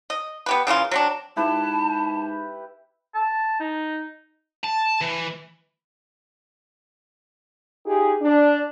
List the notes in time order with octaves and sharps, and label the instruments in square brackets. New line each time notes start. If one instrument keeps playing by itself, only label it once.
[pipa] D#5
B3 G4 B4
C#3 E3 A#3 F4
F#3 C4 D4
[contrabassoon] G#2 [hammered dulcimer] E4 G4 B4 [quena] A5
[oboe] A5
D#4
[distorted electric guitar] A5
E3
[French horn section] D#4 F4 G4 G#4
D4